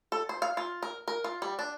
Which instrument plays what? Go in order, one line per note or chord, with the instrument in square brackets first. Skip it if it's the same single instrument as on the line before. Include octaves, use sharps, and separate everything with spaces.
[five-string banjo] A4
C5
F5
F4
A#4
A#4
F4
G3
D4